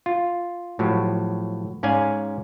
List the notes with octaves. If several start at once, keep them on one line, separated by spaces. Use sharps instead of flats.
F4
A2 F3 F#3 G4
G#2 C#4 D5 F5 G#5